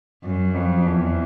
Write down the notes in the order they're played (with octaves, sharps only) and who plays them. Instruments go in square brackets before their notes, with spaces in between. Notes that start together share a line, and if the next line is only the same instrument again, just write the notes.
[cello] F#2
F2
E2